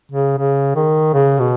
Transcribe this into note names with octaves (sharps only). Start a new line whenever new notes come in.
C#3
C#3
D#3
C#3
B2